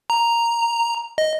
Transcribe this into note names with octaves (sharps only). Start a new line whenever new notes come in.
A#5
D#5